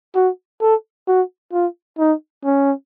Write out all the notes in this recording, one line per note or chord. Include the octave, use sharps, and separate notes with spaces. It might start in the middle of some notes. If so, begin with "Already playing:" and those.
F#4
A4
F#4
F4
D#4
C#4